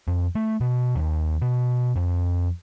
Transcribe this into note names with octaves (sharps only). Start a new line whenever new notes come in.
F2
A3
B2
D#2
B2
F2